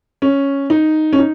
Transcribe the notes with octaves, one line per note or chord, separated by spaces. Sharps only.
C#4
D#4
C#4
D#4